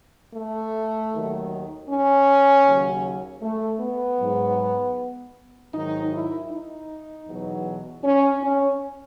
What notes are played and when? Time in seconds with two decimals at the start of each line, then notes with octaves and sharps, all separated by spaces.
0.35 A3
1.12 D#2 D#3 F#3
1.89 C#4
2.65 D#2 C#3 F#3
3.42 A3
3.81 B3
4.19 G#2 F#3
5.74 G#2 D#3 F#3 D#4
6.12 E4
6.50 D#4
7.28 E2 B2 F#3
8.04 C#4
8.42 C#4